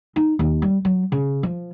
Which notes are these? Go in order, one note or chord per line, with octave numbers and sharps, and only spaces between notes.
D#4
D#2
G3
F#3
C#3
F3